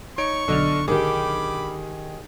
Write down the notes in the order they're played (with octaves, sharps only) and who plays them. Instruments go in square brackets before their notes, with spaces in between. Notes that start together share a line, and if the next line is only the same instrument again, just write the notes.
[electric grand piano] D#4 C#5 D7 [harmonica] C#6
[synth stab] B1 D3 F6 [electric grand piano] D4 A4 D#5
[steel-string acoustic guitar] D#3 G4 [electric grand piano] G#4 [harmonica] B5 D6